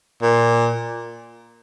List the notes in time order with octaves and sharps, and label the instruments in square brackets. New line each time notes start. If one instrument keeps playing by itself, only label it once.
[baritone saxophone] A#2